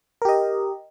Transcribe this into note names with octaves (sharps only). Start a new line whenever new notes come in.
G4 A#4 D#5